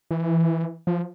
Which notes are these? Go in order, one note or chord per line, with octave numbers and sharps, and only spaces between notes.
E3
F3